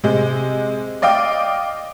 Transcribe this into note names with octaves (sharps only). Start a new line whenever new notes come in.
C3 G#3
D5 D#5 F5 G5 D6